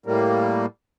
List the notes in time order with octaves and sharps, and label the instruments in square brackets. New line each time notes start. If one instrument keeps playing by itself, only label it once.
[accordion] A2 G3 A#3